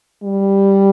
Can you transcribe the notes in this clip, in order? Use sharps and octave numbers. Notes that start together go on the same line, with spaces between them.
G3